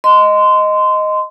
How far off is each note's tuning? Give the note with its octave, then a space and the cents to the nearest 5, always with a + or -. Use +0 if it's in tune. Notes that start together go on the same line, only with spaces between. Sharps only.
D#5 +0 C6 -20